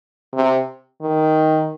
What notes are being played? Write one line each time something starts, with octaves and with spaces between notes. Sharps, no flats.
C3
D#3